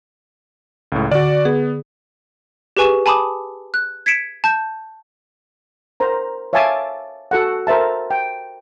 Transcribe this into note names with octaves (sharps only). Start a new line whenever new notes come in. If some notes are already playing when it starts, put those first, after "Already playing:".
C#2 A2
D3 F#4 D5
B3 G#4
G4 G#4 B4 G#5 C#6 E7
G#5 A5 B5 D6 D#6
F#6
G#6 B6 C#7 D7 E7
A5 G6
A#4 C5 A#5
C#5 E5 F5 G#5 A5 D6
F#4 A4 F#5
A#4 C5 E5 A5
G5